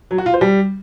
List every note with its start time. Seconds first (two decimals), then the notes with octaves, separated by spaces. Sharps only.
0.11 F#3
0.18 F#4
0.26 F4
0.34 C5
0.41 G3